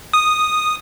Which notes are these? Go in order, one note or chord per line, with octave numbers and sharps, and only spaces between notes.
D#6